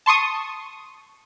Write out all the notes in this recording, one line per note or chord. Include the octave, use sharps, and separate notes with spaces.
A5 C6 C#6 D#6